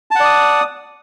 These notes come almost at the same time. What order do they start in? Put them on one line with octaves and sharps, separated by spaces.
A5 F#5 D5 D#6